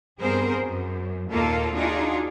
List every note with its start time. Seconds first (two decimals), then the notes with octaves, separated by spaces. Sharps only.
0.20 G2 B3 C4 G#4 A#4 C5
0.62 F#2
1.31 D#2 A#2 A#3 F4 A4
1.74 D4 D#4 F4 F#4 G#4